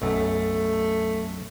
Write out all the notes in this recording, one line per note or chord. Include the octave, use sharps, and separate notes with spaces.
B1 F#2 A3